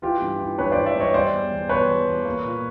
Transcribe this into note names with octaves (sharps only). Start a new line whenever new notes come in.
E3 F4 G4
G2
E3
G2 B4 C#5
E3 C5 D5
D5 E5
G2 C#5 D#5
G3 C5 D5
E2
E2
B2 B4 C#5
E2
E2
A#3
A#2